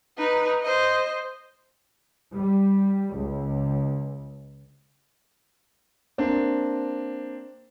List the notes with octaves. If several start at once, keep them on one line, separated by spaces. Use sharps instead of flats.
D#4 B4
C5 D#5
G3
C#2
A#3 C4 D4